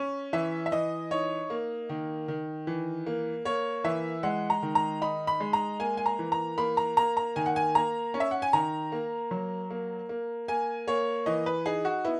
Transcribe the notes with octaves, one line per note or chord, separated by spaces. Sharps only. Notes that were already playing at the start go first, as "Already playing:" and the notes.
Already playing: C#4
E3 E5
E5
E3 D#5
D#4 C#5
A#3
D#3
D#3
E3
A#3
A#3 C#5
E3 E5
G#3 F#5
A#5
D#3
A#5
D#4 B5
B5
G#3
A#5
A#3 G#5
G#5
A#5
E3
A#5
A#3 B5
A#5
A#3 A#5
A#5
D#3 G#5
F#5
G#5
A#3 A#5
C#4
E5
F#5
G#5
D#3 A#5
A#3
F#3
A#3
A#3
A#3 G#5
A#3 C#5
E3 D#5
B4
D#4 G#4
F#4
B3 E4